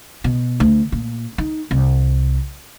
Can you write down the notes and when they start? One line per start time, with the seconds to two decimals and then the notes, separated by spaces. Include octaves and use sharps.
0.24 B2
0.60 D2
0.92 A#2
1.38 D#4
1.71 C2